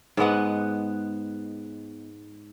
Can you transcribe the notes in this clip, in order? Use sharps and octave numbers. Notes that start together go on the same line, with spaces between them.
G#2 G#3 B3 F#5